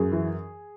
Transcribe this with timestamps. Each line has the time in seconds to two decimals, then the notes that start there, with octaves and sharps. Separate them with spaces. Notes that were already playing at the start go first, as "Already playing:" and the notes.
Already playing: F#2 G#4
0.12 E3